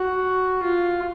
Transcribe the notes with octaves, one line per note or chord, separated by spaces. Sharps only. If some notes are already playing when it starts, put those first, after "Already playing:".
Already playing: F#4
F4